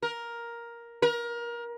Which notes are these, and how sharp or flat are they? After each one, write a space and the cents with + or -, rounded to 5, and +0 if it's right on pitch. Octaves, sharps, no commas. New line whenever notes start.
A#4 +10
A#4 +25